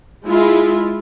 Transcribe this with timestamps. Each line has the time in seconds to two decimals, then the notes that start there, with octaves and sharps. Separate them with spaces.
0.25 G#3 E4 F4